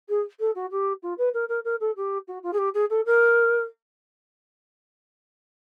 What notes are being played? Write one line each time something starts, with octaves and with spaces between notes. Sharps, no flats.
G#4
A4
F#4
G4
F4
B4
A#4
A#4
A#4
A4
G4
F#4
F4
G#4
G4
G#4
A4
A#4